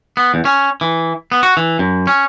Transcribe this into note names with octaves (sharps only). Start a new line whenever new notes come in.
B3
E2
C#4
E3
B3
F#4
E3
F#2
C#4